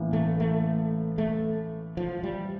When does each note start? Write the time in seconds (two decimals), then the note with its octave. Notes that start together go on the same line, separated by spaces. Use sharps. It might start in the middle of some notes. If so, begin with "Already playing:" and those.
Already playing: A1 A2 E3 A#3
0.13 A3
0.40 A3
1.18 A3
1.97 F3
2.23 G3